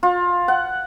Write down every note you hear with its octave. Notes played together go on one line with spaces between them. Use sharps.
F4
F#5